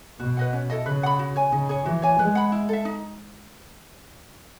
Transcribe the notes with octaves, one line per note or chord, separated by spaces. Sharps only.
B2 F#4
B4 D#5 F#5
C#4
E4 A4 D#5
C#3 B4
F#5 B5
F#4
C#5 G#5
C#3 D#4
G#4 C#5
E3 F#4
C#5 G#5
G#3 B4
F#5 B5
E4
A4 E5
D#4